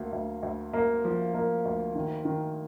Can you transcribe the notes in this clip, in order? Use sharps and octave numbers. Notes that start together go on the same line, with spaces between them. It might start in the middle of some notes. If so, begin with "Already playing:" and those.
Already playing: D2 A#3
D2
D2
A#3
F3
A#3
D2
D#3
D#3